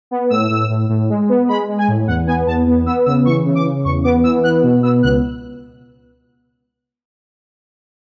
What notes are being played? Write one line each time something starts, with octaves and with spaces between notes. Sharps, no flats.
B3
A2 E6
A2
A2
A2
G#3
B3
G#3 B5
G#3
G#5
A2
E2 F#5
B3 G#5
E2 A5
B3
B3 E6
C#3 E6
E3 C#6
C#3
D6
C#3
E2 C#6
B3 D6
E3 E6
B3 F#6
B2
B3 E6
C#2 F#6